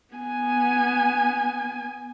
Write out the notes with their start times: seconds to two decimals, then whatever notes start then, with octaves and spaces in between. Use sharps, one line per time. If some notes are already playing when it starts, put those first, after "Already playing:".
0.16 B3 G#5